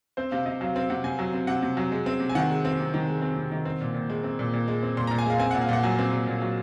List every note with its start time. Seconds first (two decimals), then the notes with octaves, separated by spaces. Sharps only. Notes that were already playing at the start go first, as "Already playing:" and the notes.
0.17 C4 C5
0.31 C3 F5
0.46 C3 D#5
0.61 F#3 F5
0.75 C4 F5
0.90 C3 F#5
1.04 C3 G#5
1.19 F#3
1.33 C4
1.47 C3 F#5
1.62 C3
1.77 F#3
1.92 G#3
2.06 C4
2.20 C3
2.29 G#5
2.35 D#3 F#5
2.50 G#3
2.65 C4
2.79 C3
2.94 D#3
3.08 G#3
3.22 C4
3.36 C3
3.52 D#3
3.65 C4
3.81 A#2
3.94 A#2
4.10 G#3
4.24 C4
4.39 A#2
4.54 A#2
4.68 G#3
4.83 C4
4.97 A#2 C6
5.07 A#2 A#5
5.18 G#5
5.26 G#3 F5
5.40 C4 G#5
5.51 A#2 F#5
5.61 F5
5.69 A#2 F#5
5.83 F#3 G#5
5.99 C4
6.13 A#2
6.27 A#2
6.42 F#3